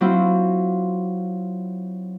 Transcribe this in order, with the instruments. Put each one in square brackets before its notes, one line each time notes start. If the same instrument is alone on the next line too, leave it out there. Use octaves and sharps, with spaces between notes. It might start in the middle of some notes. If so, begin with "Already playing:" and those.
[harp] F#3 C4 E4 F4